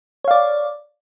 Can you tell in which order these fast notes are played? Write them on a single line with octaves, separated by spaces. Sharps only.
C#5 F5 D5